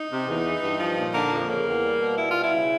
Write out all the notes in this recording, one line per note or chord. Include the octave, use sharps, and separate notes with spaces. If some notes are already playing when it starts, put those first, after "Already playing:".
Already playing: D#4
C3
E2
E3
G2
F3
A#2
D3 A#3
F2
C#3 A#3
E2
G3
B2
G3 E4
B2 F4
E4
C#3